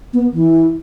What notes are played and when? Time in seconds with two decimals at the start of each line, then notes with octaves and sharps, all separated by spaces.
0.13 B3
0.33 E3